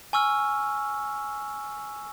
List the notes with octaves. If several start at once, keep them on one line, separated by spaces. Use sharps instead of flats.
G#5 C#6 E6 F6